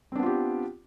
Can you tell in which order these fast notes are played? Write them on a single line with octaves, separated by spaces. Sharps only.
C4 D4 B3 F4 G4